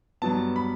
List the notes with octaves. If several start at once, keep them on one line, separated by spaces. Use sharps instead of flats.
G2 F#3 B3 A5
B5